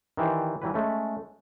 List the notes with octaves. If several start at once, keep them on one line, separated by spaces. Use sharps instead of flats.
D#3 E3 G4 C5 D5
E3 F#3 G3 E4 B4
G#3 A3 C#4